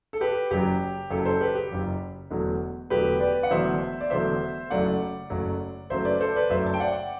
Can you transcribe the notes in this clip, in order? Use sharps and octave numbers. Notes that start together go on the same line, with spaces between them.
A4
G4 B4
F#1 F#2 F#3 G4
F#1 F#2 F#3 A4
A4 C5
G4 B4
G4
F#1 F#2 F#3
E1 E2 D3 F#3 A3
E1 E2 D3 F#3 A3 G4 B4
B4 D5
F#5
E1 E2 D3 F#3 A3 C5 E5
D5
E1 E2 D3 F#3 A3 C5 E5
F#1 F#2 F#3 A3 D5 F#5
F#1 F#2 F#3 A3
F#1 F#2 F#3 A3 C5 E5
B4 D5
A4 C5
B4 D5
F#1 F#2 F#3 A3 C5 E5
A5
G5
D5 F#5